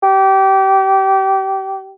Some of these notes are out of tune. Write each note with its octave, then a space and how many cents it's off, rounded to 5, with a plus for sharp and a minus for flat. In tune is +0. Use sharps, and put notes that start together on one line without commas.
G4 -25